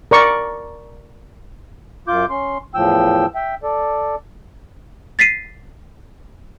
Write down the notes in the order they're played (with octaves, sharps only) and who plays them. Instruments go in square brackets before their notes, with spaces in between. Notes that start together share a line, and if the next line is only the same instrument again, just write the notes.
[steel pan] A#4 D5 C#6
[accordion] F#2 F4 D6 G6
C#4 C6
E2 A2 F3 G5 E6
E5 G5
A4 D5
[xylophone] A6 B6 C7 D#7